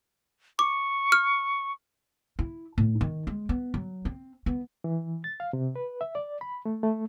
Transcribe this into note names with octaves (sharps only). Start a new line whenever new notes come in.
C#6 D6
F6
E4
A2
D#3
G#3
B3
F#3
C4
B3
E3
A6
F5
C3
B4
E5
D5
B5
A3
A3